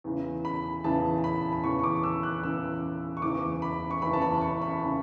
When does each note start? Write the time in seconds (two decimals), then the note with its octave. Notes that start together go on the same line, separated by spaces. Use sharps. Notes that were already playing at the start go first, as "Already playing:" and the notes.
0.04 E2 C#3 E3
0.45 B5
0.84 E2 C#3 E3 A5
1.24 B5
1.53 B5
1.64 E2 C#3 E3 C#6
1.79 C#6
1.84 D6
2.03 E6
2.23 F#6
2.43 E2 C#3 E3 E6
3.17 C#6
3.22 F#1 E2 C#3 E3 D6
3.62 B5
3.91 C#6
4.02 F#1 E2 C#3 E3 B5
4.13 A5
4.22 B5
4.42 C#6
4.62 B5
4.84 C#3 E3